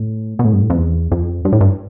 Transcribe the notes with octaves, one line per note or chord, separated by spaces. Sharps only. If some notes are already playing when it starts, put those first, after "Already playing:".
Already playing: A2
B2
A2
G2
A2
F2
E2
F2
G2
A2
G2